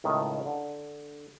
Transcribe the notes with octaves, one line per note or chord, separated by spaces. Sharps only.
C#2 A2 D#3
D3